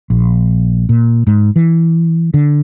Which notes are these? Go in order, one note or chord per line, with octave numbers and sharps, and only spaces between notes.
A#1
A#2
G#2
E3
D3